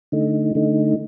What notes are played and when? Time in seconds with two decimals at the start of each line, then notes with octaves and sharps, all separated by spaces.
0.12 D3 A3 D#4
0.55 D3 A3 D#4